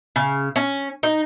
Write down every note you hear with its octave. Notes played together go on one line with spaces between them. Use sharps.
C#3
C#4
D#4